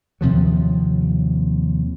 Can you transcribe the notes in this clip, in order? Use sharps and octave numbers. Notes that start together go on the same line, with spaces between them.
D#2 C3 F3 F#3